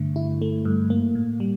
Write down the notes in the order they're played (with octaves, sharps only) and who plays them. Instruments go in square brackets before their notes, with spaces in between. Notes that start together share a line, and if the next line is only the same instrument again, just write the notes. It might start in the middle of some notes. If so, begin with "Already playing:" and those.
Already playing: [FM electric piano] G2 D3 A3
E4
A3
G2
A#3
A2
G3